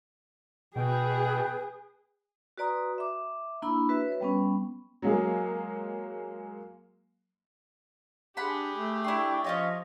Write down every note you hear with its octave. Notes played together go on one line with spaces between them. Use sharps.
B2 G#4 B4 G5
F#4 B4 D5 A#5 C6 D#6
E5 D6
A#3 D4 E4 B5 E6
F#4 B4 E5
B4 C#5
G3 B3 C#4
F#3 G#3 A#3 G#4
D4 G4 G#4 F#5 B5 C6
A3
D4 E4 G5 C6 C#6
F3 C#4 F4 C#5 D#5